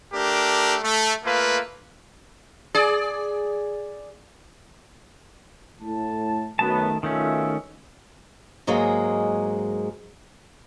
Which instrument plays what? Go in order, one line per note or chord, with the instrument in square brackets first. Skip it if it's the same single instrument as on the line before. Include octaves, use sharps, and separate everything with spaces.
[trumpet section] A3 D4 G4 A#4
A3
A3 A#3 F4 B4
[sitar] G#4 D5
[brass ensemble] A2 A5
[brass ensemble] F#2 B3 [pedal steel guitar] D#3 A3 A5
[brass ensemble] B1 F4 E5 [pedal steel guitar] D#3 A3 C#4
[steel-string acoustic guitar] G#2 F#3 G#3 A#3 G#4